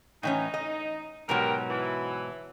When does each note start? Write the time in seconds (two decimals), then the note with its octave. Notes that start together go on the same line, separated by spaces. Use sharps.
0.23 A2 E3 C#4 D#4
0.54 D#5
1.29 G#2 B2 F#3 G3 G4 A#4
1.70 E3